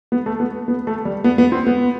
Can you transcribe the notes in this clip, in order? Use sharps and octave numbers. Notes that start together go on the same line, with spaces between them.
B3
A3
B3
B3
A3
G3
B3
B3
C4
B3